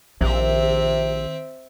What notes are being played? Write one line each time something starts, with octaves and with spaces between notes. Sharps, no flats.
A#1 C3 D#3 C4 E5